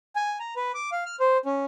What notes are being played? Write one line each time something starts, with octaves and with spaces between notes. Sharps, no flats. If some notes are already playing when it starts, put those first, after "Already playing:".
G#5
A#5
B4
D6
F5
F6
C5
C#4